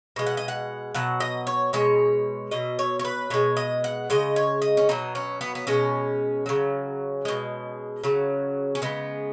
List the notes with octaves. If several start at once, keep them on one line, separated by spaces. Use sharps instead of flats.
B2 G#3
F#5
D#5
F#5
B2 F#3 F#5
D#5
C#5
B2 G#3 C#5
B2 F#3 D#5
C#5
C#5
B4
B2 G#3 C#5
D#5
F#5
C#3 G#3 D#5
C#5
D#5
C#4
B2 F#3 D#4
C#4
B3
B3
B2 G#3 C#4
C#3 F#3
B2 G#3
C#3 F#3
C#4
C#3 G#3 B3